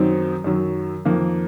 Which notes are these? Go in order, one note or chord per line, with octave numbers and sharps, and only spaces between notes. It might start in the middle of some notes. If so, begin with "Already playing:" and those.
Already playing: F#2 D#3 F#3 C4 D#4
F#2 D#3 F#3
F2 D#3 A#3